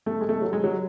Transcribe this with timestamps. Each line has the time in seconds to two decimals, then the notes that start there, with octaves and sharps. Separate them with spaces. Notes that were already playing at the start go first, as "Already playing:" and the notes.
0.06 A3
0.21 G#3
0.29 A3
0.42 F#3
0.53 G#3
0.64 F#3